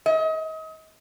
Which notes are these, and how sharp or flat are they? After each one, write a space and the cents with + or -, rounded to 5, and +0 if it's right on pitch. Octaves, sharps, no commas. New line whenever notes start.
D#5 +35